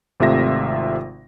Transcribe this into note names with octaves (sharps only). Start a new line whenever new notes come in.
G#1 C3 A3 F4 E5 A#6